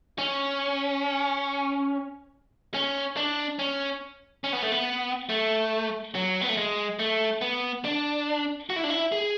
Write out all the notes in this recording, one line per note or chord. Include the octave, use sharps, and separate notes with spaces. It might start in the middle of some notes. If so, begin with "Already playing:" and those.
C#4
C#4
D4
C#4
C#4
B3
A3
B3
A3
F#3
B3
A3
G#3
A3
B3
D4
F#4
E4
D4
E4
G#4